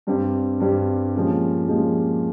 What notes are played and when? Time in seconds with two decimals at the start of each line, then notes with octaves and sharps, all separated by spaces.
0.07 G2 G3 C4 G4
0.60 G2 G3 C4 G4
1.15 A#2 F3 G#3 C#4 G4
1.69 A#2 F3 G#3 C#4 G4